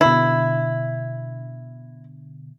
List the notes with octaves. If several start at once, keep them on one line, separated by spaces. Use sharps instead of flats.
B2 D3 E4